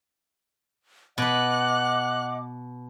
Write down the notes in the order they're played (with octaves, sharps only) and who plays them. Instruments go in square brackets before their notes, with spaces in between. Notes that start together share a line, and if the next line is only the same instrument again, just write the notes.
[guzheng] B2 B4 [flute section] D#5 F#5 D6 [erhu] F#6